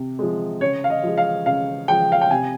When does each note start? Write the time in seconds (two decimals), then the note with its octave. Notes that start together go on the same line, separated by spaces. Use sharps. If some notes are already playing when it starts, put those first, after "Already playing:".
Already playing: C3
0.19 F3 G#3
0.61 C#3 C#5
0.84 F5
0.90 D#5
1.04 F3 G#3
1.18 F5
1.46 C#3 F5
1.88 F3 G#3 G5
2.12 F5
2.21 G5
2.31 C3 G#5